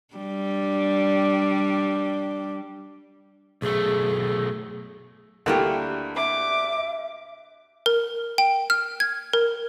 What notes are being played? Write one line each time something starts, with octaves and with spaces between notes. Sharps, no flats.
G3 D4
B1 A3 G#4
D2 A3 A#3 D4 E4 G4
E5 D6
A#4
G5
F6
G#6
A#4